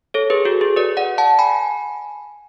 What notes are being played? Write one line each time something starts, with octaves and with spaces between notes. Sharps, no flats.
A4 C#5
G#4 B4
F#4 A4
G#4
B4 D5
D5 F#5
F#5 A5
G#5 B5